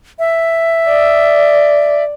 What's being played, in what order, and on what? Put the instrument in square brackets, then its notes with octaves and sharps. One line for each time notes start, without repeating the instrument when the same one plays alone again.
[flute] E5
[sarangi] D5